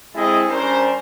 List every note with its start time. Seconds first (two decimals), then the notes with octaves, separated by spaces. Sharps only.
0.14 G#3 C4 E4 G#4 A4 D#5
0.48 G3 C#4 D4 A#4 C5